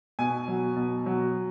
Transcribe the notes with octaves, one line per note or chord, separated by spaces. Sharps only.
B2 G#5
F#3
B2
F#3